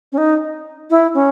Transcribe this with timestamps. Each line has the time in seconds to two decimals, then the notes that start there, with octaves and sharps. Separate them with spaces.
0.12 C#4
0.18 D#4
0.90 E4
1.14 C#4